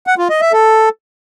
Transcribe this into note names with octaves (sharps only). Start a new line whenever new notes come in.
F#5
F4
D#5
E5
A4